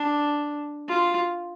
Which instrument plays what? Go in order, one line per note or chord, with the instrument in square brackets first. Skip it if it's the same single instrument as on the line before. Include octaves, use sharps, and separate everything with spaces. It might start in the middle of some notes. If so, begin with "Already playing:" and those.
Already playing: [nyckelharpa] D4
F4